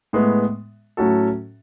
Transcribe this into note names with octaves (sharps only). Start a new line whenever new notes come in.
A2 G#3 B3
A2 F#3 C#4 F#4 A4